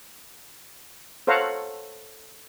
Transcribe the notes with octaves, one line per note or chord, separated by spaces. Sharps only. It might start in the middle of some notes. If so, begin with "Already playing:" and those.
A4 C5 C#5 F5 F#5 A#5